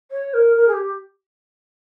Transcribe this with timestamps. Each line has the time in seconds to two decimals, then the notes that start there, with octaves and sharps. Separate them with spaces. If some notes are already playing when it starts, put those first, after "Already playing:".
0.11 C#5
0.33 A#4
0.56 A#4
0.68 G#4
0.73 G4